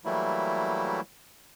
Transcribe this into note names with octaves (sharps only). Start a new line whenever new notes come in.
E3 F#3 G3 A3 A#3 E4